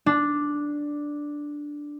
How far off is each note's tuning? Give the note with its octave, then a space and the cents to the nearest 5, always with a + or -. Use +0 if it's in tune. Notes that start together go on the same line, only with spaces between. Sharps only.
D4 +0